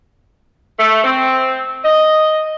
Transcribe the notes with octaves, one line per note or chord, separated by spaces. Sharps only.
A3
C4
D#5